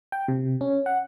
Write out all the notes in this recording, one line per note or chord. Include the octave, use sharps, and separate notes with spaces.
G5
C3
C#4
F#5